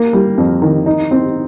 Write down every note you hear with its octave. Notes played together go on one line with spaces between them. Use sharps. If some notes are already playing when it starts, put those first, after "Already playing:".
Already playing: A#3
G3
F2
D#3
D#4
C4